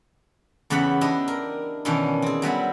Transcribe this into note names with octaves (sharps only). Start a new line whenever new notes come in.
E2 C#3 B3 G4 F#5 B5
D4 E4 G4 D#5
A#4
B2 D#3 E3 C#4 D4 E4
C4 G#4
F#3 G3 B3 E4